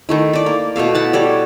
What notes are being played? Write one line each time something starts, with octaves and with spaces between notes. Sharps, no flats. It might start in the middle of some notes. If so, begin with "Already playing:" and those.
D#3 A3 E4
A4 D5
A#3
B2 A3 A4 F5
E4 F#5 A5
G3 A4 C#5 D5